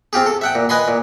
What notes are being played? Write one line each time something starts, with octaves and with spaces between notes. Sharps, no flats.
C4 F4 G4 G#4
A4
E5 F#5 G5
A#2
B4 D#5 G#5 B5 C6
A#2